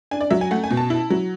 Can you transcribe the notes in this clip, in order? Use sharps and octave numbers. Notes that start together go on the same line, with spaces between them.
D4 G#5
D5
F#3 E5
G#5
A3 F#5
G#5
B2
A5
E4
F#3